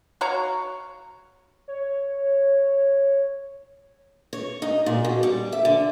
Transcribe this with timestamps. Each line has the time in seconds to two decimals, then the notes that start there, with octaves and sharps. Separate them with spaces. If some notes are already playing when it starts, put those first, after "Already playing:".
0.21 F#4 C#5 F5 A#5
1.68 C#5
4.33 C#5
4.62 D#4
4.86 A#2
5.05 B2
5.23 G3
5.52 E5
5.65 D3